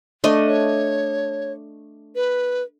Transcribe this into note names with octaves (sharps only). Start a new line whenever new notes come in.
A3 D4 D#5
C#5
B4